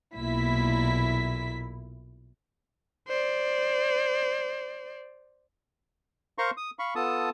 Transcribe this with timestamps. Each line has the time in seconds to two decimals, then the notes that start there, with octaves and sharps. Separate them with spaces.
0.15 B1 A#2 E4 B6
3.08 C5 D5
6.38 A#4 C5 F5 A#5 C6 C#6
6.57 D#6
6.79 F5 B5 C#6
6.95 B3 F4 A4 A5 D#6